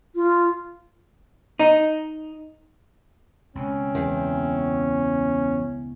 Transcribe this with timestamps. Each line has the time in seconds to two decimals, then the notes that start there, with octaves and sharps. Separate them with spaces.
0.15 F4
1.59 D#4
3.55 C#2 B2 C4 C#4
3.95 E2